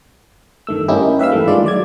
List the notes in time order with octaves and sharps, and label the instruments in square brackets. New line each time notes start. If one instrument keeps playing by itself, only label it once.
[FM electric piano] G2 D#3 A3 E6
A#3 C#4 D#4 E4 G4
B4 E5 F5 E6
G2 E3 A3
D#3 G#3 F4 D5
F#3 D5 G#6